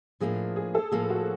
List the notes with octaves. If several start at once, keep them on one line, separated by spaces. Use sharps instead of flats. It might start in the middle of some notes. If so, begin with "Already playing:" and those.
A2 F3 A#3 D4 G#4
G#4
A4
A2 F3 A#3 G#4
F#4